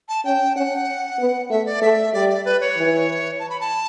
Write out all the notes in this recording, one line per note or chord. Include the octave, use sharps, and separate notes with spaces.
A5
C#4 G5
C#4 F#5
B3
A3 E5
D5
A3 E5
G3 D5
D5
B4
C#5
E3
A5
B5
A5